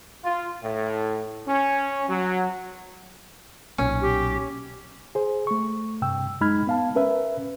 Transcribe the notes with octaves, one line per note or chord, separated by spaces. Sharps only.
F4
A2
C#4
F#3
B1 A#2 C#4
G4
G#4 C5
A3 C#6
G2 C3 G5 E6
F#2 G#3 D#4 B5 F6 G#6
B3 F5 A5
C#4 A#4 B4 E5